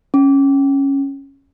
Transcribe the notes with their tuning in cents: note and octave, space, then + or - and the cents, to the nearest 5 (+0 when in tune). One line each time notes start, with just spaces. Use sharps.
C#4 -10